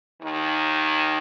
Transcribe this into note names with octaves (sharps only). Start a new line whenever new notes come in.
D#2 D#3